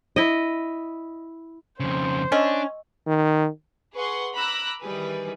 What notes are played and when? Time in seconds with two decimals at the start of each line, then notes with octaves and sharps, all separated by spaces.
0.16 E4 D#5
1.80 F2 C#3 C5
2.32 C#4 D4 D#5 E6
3.07 D#3
3.94 G#4 B4 F#5 C6 C#6
4.35 A#5 B5 D6 E6 F#6 A#6
4.81 D#3 E3 G3 G#4 B4